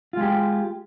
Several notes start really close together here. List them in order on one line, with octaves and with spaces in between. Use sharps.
F4 G#3 G4